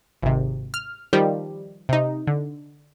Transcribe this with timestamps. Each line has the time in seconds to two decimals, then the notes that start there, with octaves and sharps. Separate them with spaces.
0.22 G#1 C3
0.74 F6
1.13 D#3 F3 G3 G4
1.89 C3 D#4
2.27 D3